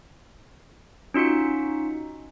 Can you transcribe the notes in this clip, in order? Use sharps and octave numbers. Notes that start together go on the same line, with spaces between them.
C#4 D#4 F4 F#4 C#7